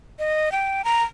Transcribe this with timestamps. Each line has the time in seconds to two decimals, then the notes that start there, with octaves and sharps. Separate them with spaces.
0.19 D#5
0.52 G5
0.85 A#5